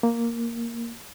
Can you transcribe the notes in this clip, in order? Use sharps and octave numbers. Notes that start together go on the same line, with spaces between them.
A#3